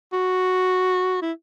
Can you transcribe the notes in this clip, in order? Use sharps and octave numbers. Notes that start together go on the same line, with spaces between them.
F#4
E4